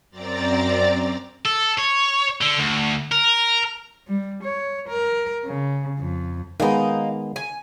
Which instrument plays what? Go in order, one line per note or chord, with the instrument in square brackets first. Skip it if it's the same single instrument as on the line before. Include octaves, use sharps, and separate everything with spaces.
[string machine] F#2 C4 D5 A#5 A6
[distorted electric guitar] A4
C#5
D3
D2
A#4
[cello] G3
C#5
A#4
C#3
F2
[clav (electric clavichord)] D#3 G#3 B3 [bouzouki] A#3 D#4
[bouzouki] G#5